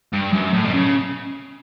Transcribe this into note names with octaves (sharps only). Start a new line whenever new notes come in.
G2
F#2
A2
B2
C#3